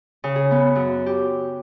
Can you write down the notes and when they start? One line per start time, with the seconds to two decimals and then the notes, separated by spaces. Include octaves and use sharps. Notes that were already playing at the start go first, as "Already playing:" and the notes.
0.24 C#3
0.36 G#4
0.51 B3
0.75 F#2
1.06 G4